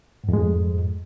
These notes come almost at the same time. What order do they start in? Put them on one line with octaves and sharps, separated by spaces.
G#2 F2 G#3 F3